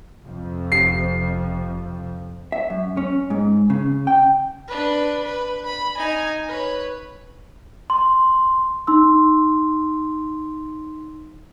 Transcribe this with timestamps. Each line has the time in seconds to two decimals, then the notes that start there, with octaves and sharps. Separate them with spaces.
0.23 F2 C3 F3
0.72 F1 C7
2.52 E5
2.70 F#2
2.97 C#4
3.30 G#2
3.70 C#3
4.07 G5
4.68 D4 B4
5.25 B4
5.66 B5
5.97 D#4 G#5
6.49 B4 C#5
7.90 C6
8.87 D#4 C6 E6